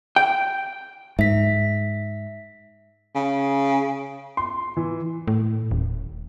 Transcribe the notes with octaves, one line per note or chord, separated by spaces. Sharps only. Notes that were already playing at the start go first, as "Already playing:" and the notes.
G5
G#2 E5 B6
C#3
C6
E3
A2
D#1